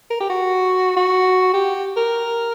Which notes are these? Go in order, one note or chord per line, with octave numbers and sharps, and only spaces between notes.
A#4
G4
F#4
F#4
G4
A#4